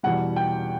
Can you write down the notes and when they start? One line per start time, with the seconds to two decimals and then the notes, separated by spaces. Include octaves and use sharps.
0.03 E2 B2 G3 F#5
0.36 G5